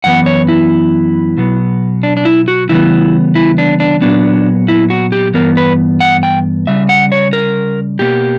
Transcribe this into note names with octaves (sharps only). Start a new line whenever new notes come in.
F#2 E3 B3 F#5
C#5
E4
B2 F#3 B3
D4
D4
E4
F#4
C#3 E3 G3 B3 E4
E4
D4
D4
A#2 F#3 B3 D4
E4
F#4
G4
G2 E3 B3 A#4
B4
F#5
G5
C#3 G3 E5
F#5
C#5
A#4
B2 A#3 G4